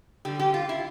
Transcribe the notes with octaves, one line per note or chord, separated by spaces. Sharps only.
D3 G3 G4
G4
F4
E4